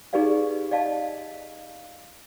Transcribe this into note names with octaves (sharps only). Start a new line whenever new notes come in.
D#4 G4 G#4 B4 D5 F5
D5 D#5 F5 A5